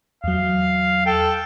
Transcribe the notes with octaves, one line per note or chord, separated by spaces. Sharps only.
E2 F#3 F5
A4 G5